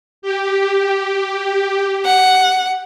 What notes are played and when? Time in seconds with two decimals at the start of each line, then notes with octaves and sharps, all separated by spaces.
0.22 G4
2.05 F#5